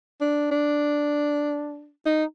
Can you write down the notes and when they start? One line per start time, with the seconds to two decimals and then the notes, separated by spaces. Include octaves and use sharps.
0.21 D4
0.51 D4
2.06 D#4